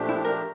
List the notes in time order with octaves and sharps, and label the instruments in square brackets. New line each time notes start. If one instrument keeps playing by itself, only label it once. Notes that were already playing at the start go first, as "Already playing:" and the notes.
Already playing: [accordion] A#2 F3 A3 D4 G4
[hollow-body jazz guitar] E4
A#4